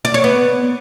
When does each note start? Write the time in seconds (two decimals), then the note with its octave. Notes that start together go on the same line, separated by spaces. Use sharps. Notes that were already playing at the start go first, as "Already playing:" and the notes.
0.05 D5
0.14 C#5
0.24 B3